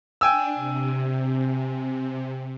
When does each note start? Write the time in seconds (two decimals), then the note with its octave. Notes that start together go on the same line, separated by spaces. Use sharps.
0.21 D4 G5 G#5 E6
0.55 C3